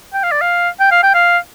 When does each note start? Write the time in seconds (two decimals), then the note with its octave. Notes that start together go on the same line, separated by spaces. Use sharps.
0.14 G5
0.23 F5
0.32 D5
0.42 F5
0.80 G5
0.91 F5
1.03 G5
1.14 F5